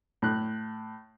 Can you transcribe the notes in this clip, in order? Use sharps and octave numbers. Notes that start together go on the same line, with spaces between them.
A2 F#6